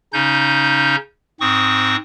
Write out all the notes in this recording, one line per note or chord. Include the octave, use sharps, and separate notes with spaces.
C#3 C#4 D#4 G6
G#2 C4 C#6 D#6